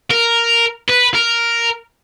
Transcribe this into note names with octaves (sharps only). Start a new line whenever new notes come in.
A#4
B4
A#4